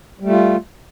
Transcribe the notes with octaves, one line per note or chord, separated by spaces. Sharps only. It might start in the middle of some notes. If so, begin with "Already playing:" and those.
G3 A3 F4